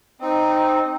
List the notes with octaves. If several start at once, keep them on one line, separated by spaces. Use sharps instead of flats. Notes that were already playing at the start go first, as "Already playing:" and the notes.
C4 D#4